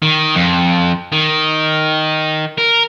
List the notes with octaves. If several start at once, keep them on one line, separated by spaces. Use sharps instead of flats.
D#3
F2
D#3
A#4